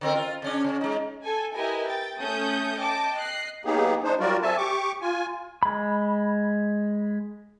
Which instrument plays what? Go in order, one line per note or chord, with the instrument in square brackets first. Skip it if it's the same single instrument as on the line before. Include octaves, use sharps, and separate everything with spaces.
[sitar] D3 C4 A#4
F4
C#3 C#4 D4
C#3 C#4
G#3 D#4
[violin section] A4 G#5
E4 G4 A#4 B4 D#5 G#5
G5 A6
A3 C#4 A4 D#6 G6
D#5 G5 A5 D6
D#5 F#6 C7
[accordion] F#3 A#3 B3 D#4 G4 G#4
D4 D#4 C5
F#3 G3 F4 F#4 A#4 D5
C4 A4 E5 G#5 A5
G4 C#6 D6
F4 G#5
[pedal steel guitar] G#3 B5